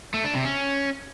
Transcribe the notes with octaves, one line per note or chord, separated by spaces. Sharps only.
A3
D4
C3
C#4